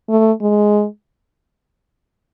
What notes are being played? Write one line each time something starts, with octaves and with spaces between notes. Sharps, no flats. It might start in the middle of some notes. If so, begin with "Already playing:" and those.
A3
G#3